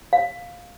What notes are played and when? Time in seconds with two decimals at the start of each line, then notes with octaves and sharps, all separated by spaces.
0.13 F5